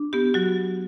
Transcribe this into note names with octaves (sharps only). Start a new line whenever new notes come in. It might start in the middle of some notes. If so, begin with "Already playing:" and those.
Already playing: D4
B3 G4
F#3 F#4